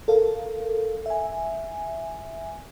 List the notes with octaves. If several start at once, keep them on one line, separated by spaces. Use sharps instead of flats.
A4 A#4 F5
E5 G#5